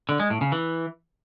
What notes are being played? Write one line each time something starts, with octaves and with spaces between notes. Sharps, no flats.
D3
G#3
A2
C#3
E3